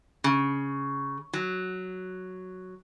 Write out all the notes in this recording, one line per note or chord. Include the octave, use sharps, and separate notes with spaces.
C#3
F#3